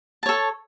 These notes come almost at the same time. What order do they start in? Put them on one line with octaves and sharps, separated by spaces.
A5 C#5 A4